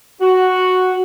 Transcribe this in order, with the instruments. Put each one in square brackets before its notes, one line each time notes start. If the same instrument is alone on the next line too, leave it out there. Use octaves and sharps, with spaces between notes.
[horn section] F#4